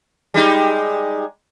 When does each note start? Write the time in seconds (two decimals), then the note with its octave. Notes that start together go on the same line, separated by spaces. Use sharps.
0.34 G3 G#3 D#4